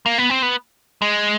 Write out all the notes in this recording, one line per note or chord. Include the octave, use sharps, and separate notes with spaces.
A#3
B3
C4
B3
G#3